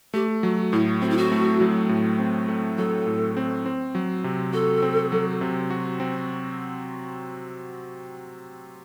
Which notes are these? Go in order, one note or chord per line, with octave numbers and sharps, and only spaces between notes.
A3 G4
F#3 F#4
A2 E4
C4 F#4
E4
F#4
A3
F#3
A2
C4
A3
F#3 A4
A2
C4
C4
F#3
C3
F#4 A4
C4
F#3
C3
F#4
C4